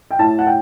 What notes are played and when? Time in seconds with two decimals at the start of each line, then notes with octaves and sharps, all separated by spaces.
0.11 G5
0.19 A2 A5
0.39 F#5
0.47 G5